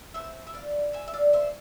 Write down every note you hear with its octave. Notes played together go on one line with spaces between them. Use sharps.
E3 A3 C4 C5 E5
E5
D5 F5
E5 G#5
E5
D5 F5
C5 E5